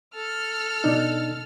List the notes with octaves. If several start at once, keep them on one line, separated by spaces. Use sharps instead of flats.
A4 F6
B2 D4 D#4